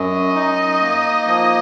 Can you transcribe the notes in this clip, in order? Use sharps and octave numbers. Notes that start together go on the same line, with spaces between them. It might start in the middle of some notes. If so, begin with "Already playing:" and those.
Already playing: F#2 D#5
D#4
A#3
F3